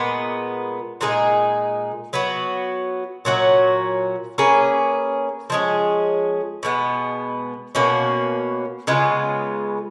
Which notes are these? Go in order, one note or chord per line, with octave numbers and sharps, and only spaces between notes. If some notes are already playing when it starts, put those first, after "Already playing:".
Already playing: A#2 G#3 B3
A#2 G#3 D#4 G#4
F#3 B3 F#4
A#2 F#3 C#4 F#4
A#3 C#4 G#4 B4
F3 G#3 C#4 G#4
B2 G#3 B3
B2 A#3 C#4 F#4
C#3 G#3 B3 F4